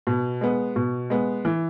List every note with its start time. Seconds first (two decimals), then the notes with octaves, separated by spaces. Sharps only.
0.07 B2
0.41 G#3 B3
0.76 B2
1.10 G#3 B3
1.45 E3